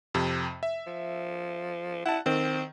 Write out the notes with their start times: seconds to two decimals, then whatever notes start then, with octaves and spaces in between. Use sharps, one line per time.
0.14 F2 C3
0.63 E5
0.87 F3
2.06 E4 F#5 A5
2.26 D#3 C4